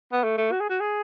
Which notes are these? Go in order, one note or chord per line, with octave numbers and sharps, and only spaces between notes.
B3
A3
A3
F#4
G#4
F#4
G#4